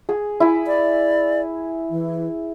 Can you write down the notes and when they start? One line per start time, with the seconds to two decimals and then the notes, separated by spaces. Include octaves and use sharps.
0.09 G#4
0.40 E4 G#5
0.67 D5
1.90 E3